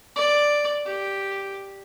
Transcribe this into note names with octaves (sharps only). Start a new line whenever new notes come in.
D5
G4